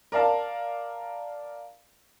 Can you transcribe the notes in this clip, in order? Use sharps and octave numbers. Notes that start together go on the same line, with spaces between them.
A#4 D5 F5 A5